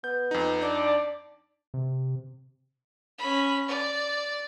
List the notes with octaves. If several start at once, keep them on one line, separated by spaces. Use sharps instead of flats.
B3 G6
F2 D#4
D4 D5
C3
C#4 B5
D5